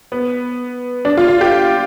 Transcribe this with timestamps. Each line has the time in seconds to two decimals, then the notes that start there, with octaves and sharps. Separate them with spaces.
0.12 B3
1.05 D4
1.17 F4
1.28 F4
1.41 G4